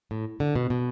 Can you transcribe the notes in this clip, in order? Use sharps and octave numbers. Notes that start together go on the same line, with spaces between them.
A2
D3
B2
B2